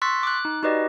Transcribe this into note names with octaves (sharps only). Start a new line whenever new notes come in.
C6 C#6 E6 F#6 A6 B6
D6 F#6
D#4
D#4 F#4 G4 B4 D5 D#5